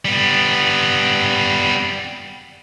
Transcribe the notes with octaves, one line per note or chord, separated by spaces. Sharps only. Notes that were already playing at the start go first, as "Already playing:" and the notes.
G3 B3